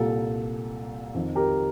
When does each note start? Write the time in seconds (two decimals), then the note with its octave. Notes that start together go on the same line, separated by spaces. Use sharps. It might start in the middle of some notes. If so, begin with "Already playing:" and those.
Already playing: C2 A#2 A4
1.15 F2 D#3
1.35 G4 A#4